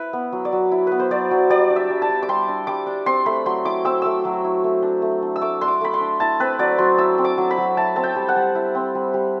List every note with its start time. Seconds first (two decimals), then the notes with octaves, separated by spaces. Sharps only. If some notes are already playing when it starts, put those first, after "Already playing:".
Already playing: E4 B4
0.13 B3
0.32 F#3
0.45 D5
0.52 F#3
0.72 E4
0.87 B3 B4
0.99 C5
1.10 F#3 D5
1.31 F#3
1.50 G3 D5
1.70 D4
1.76 E5
1.90 G3
2.02 A5
2.09 D4
2.23 D6
2.29 G3 C6
2.48 D4
2.67 G3 D6
2.87 D4
3.06 C4 C6
3.26 A3 B5
3.46 F#3 C6
3.65 E4 D6
3.84 C4 E6
4.02 A3 E6
4.25 F#3
4.44 E4
4.64 A3
4.82 D4
5.02 A3
5.22 D4
5.36 E6
5.41 A3 D6
5.61 D4 C6
5.68 D6
5.81 A3 B5
5.94 C6
6.01 D4
6.20 E4 A5
6.40 C4 B4
6.59 F#3 D5
6.78 F#3 C6
6.98 E4 E6
7.18 C4
7.24 D6
7.38 F#3
7.51 B5
7.58 F#3
7.77 E4 A5
7.96 C4 A5
8.04 G5
8.16 G3
8.29 F#5
8.36 G3
8.55 E4
8.75 C4
8.95 G3
9.14 G3